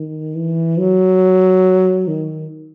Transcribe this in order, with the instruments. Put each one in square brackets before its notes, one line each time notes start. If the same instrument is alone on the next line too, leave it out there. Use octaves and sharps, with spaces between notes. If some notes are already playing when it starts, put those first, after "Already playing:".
Already playing: [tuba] D#3
E3
F#3
D#3